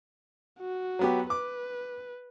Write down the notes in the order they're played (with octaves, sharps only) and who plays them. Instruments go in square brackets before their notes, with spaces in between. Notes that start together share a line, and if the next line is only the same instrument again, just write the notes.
[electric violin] F#4
[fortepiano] F#3 B3 G4
[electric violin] B4 [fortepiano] D6